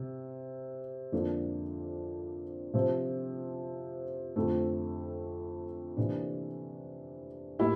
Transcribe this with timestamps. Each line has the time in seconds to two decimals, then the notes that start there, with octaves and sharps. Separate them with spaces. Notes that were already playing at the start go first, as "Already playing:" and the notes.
Already playing: C3
1.12 F2 D3 F3 A#3 D4
2.74 C3 F3 C4
4.36 F2 D3 A3 C4
5.97 C3 E3 A#3 D4
7.59 A2 G3 A#3 E4